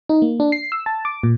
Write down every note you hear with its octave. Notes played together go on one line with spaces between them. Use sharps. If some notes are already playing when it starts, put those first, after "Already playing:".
D#4
A#3
D4
C7
E6
A5
D6
A#2